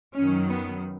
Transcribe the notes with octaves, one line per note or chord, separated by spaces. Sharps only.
F#2 D#3 F#3 C#4
B3